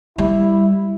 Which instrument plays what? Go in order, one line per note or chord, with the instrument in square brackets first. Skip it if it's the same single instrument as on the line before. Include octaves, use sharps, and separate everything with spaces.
[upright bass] G3 [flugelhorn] E4